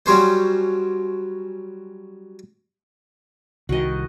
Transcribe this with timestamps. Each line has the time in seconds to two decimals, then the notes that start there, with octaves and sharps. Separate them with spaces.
0.06 F#3 G3 C#4 C5
3.69 C2 D#3 F#4 D#5